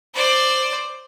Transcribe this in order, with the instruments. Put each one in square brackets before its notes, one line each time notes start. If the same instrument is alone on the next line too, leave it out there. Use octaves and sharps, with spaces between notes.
[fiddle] C5 D5